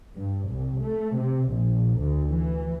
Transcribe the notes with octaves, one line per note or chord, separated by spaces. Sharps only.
G2
C2
A3
C3
A#1
D2
E3